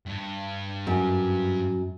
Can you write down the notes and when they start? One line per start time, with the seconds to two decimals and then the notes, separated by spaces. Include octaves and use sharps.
0.06 G2
0.87 F#2